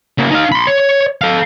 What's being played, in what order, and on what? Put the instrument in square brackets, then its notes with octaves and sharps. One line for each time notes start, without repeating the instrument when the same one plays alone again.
[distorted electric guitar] C#3 A#3
D#4 F5
B5 C6
C#5
A4 F5